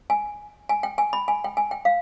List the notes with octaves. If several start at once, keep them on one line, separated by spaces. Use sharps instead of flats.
G#5
G#5
G5
G#5
B5
G#5
G5
G#5
G5
F5